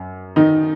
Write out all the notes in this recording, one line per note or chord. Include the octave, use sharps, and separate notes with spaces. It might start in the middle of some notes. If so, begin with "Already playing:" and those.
Already playing: F#2
D#3 D#4